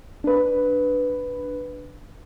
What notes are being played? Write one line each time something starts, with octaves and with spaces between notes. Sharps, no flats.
D4 B4